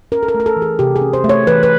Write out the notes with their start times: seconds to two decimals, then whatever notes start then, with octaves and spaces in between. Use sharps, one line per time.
0.12 C#4 A#4
0.23 A4
0.28 A#4
0.35 A3
0.40 A#4
0.46 A4
0.56 E3
0.62 G#4
0.79 C3 G4
0.96 G#4
1.01 C#4
1.13 C5
1.24 A3
1.29 C#5
1.47 E3 B4
1.63 B4